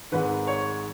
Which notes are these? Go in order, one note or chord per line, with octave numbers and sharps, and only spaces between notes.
G#1 G#2 D#3 B4
C#5